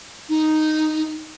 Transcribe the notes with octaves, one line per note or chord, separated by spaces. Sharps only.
D#4